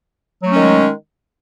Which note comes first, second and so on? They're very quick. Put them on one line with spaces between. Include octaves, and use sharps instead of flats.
F#3 A3 C#4 D#3 G#3